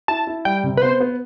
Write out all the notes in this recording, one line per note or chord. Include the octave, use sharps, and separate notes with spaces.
E4 A5
E4
G3 G5
C3
B4
B3 C5
B3